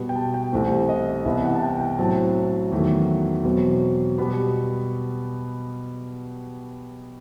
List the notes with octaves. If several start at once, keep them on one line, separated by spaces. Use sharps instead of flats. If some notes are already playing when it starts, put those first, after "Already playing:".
Already playing: B2 G3 B3
G5
A5
G5
C2 C3 E3 A3 C4
D#5
C2 C3 E3 B3 E5
F#5
A5
G5
G5
A2 F#3 C4 A5
E2 D#3 F#3 A3
E2 B2 F#3 C4
B2 G3 B3 B5